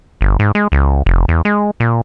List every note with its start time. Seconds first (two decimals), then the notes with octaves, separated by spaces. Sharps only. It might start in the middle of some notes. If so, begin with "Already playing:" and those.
0.21 G1
0.39 G#2
0.55 G#3
0.72 C#2
1.06 F1
1.28 E2
1.45 G#3
1.80 A#2